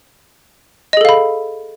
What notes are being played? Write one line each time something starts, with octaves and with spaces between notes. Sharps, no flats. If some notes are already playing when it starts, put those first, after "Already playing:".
G#4 A4 D#5 F5 B5